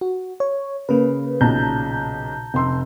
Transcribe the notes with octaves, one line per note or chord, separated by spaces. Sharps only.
F#4
C#5
C#3 A#3 B4
B1 A#2 C#3 A5 A#5 G6
F1 C6 E6